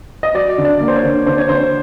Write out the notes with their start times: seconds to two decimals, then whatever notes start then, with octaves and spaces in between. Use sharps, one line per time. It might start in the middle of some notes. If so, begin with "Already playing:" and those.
0.23 D#5
0.34 F#3 D5
0.58 D3
0.65 D5
0.80 A#3
0.88 C5
0.95 C#5
1.03 D3
1.26 D3 C5
1.38 C#5
1.49 D3 C5